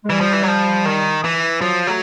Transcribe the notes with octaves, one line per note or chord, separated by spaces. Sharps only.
G#3
E3 G3
F3
E3
F#3
F3
D#3
E3
F3 F#3
F#3 A3